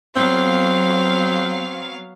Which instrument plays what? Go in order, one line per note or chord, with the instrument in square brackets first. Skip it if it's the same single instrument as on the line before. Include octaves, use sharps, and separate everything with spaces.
[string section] F#3 B3 F5 [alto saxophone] C4